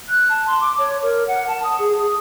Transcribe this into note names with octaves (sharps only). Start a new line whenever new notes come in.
F#6
A5
C6
D6
C#5
A#4
F#5
A5
D#6
G#4
D#6